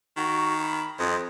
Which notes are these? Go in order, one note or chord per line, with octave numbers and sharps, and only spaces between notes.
D#3 F#4
B5
F2 C5 D#5